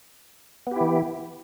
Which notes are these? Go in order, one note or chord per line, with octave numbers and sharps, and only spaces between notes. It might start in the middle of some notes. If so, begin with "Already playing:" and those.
E3 B3 E4 G4